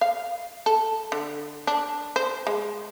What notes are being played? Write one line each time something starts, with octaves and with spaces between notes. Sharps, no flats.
F5
A4
D3
D4
C5
G#3